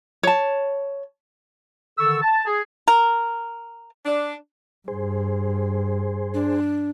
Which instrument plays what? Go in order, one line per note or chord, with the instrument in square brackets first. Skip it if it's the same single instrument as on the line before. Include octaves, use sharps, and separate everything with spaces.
[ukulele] C#5 A5
[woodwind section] D3 D#3 A4 C#6 E6
A5
G#4
[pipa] A#4
[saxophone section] D4
[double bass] G2 [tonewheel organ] G#4 C5
[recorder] D4